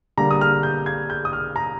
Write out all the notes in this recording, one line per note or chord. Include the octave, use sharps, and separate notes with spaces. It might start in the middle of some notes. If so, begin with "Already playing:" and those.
D3 G3 A#3 A#5
D#6
F6
G6
G#6
G6
D#6
F6
A#5